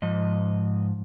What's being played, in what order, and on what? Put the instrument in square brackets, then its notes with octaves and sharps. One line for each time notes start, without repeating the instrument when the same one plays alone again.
[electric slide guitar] G#2 F3 D#5